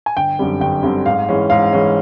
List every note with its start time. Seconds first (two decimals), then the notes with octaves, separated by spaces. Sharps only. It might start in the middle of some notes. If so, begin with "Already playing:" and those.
0.06 G#5
0.17 G1 G5
0.39 F#2 D3 G3 C4
0.61 G1 G5
0.83 F#2 D3 G3 C4
1.06 G#2 F5
1.29 E3 G#3 C#4
1.50 G#2 F5
1.73 E3 G#3 C#4